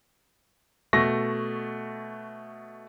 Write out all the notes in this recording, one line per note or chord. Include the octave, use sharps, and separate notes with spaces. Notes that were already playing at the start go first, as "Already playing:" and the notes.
B2 A3 C#6 A#6